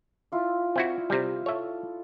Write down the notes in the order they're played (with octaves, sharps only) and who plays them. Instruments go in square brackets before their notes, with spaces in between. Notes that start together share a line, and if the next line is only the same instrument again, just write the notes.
[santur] E4 F4 D5
[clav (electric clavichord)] C4 E4 F#4 [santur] D5
[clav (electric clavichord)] C3 G3
[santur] A4 [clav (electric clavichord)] C#5 E5